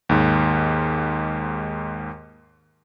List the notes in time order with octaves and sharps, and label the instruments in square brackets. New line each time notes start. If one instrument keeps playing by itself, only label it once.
[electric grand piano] D#2 G#2